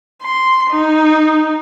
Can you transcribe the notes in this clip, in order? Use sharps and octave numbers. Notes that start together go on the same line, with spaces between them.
C6
D#4